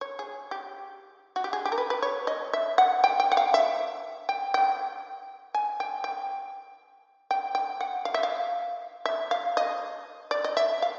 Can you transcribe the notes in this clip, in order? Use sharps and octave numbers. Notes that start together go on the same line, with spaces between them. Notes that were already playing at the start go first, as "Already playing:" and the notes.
C#5
G#4
G4
F#4
G4
G#4
G4
A#4
B4
B4
C#5
D#5
E5
F#5
G5
G5
F#5
F5
E5
G5
G5
G#5
G5
G5
G5
G5
F#5
F5
E5
F5
E5
F5
D#5
D5
D#5
E5
F5